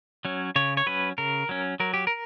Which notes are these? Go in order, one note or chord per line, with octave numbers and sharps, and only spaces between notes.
F#3 C#4
C#3 C#5
C#5
F#3 C#4 B4
C#3 A#4
F#3 C#4
F#3 A#4
G4
A#4